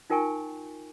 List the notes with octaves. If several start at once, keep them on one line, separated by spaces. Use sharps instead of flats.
D#4 F4 A#4 G5 G#5 C#6